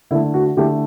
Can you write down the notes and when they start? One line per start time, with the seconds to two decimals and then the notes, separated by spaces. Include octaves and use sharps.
0.11 D3 E4
0.15 A3
0.34 F#4
0.57 D3 A3 E4 G4